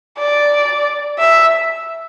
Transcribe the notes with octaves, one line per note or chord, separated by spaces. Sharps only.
D5
E5